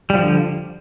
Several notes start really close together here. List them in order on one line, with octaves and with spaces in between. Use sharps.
G3 F3 D3